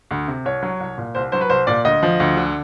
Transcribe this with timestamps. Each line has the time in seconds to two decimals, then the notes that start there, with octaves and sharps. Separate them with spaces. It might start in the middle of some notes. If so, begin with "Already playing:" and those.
0.11 D2
0.28 C3
0.45 C2 C#5
0.63 F#3
0.80 C2
0.98 A#2
1.15 C2 C5
1.32 F#3 C5
1.41 B4
1.49 C2 C5
1.67 A#2 D5
1.84 D2 D#5
2.03 F3
2.20 D2
2.37 D3